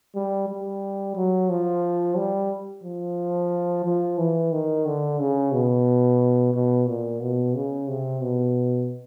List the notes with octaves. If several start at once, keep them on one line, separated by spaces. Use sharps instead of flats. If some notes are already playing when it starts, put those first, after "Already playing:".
G3
G3
F#3
F3
G3
F3
F3
E3
D#3
D3
C#3
B2
B2
A#2
B2
C#3
C3
B2